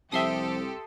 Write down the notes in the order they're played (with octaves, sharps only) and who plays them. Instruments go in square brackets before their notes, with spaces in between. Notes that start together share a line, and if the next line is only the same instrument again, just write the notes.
[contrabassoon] C2 [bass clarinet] F3 [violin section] G4 A4 [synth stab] E5 C6 D#6